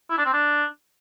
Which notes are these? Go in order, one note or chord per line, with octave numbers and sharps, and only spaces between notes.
E4
D4
C4
D4